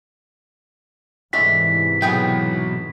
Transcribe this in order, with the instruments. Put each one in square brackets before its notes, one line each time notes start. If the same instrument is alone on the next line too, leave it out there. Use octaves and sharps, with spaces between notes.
[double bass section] G#2 C3 E3 [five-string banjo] G#3 A3 D4 [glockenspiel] B6
[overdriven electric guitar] B2 F#3 [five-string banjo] B3 G#4 G5